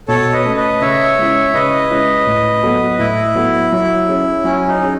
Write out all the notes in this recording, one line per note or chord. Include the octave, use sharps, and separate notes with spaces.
B2 A4 C#5
B4 D#5
A3 C#4
B4 D#5
C#3 C#5 E5
G#3 C#4 E4
C#3 B4 D#5
G#3 C#4 E4
A2
F#3 B3 F#4 A4
A2 E4
F#3 B3 F#4 A4
F#3
C#4 G#4
F#3 C#4
D#4
C#4 G#4